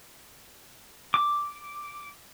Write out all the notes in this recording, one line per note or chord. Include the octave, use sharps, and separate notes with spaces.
D6